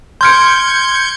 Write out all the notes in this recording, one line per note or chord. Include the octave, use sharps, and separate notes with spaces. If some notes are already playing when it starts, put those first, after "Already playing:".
C6 F6 G6 G#6 C#7 D7